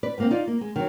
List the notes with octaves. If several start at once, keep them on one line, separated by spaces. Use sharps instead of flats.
B4 D5
G#2 A#3 C4
D#4 F4 D5
A#3
G#3
D#3 F#3